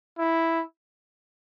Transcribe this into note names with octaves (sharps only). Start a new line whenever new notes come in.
E4